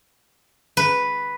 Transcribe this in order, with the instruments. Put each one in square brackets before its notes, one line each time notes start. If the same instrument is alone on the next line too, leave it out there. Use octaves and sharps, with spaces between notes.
[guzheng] B4